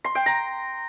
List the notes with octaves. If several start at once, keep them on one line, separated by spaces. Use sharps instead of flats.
C6
G5
A#5